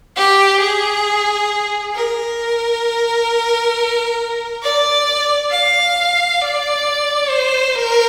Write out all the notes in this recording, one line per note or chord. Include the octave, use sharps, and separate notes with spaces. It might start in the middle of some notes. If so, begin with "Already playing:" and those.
G4
G#4
A#4
D5
F5
D5
C5
A#4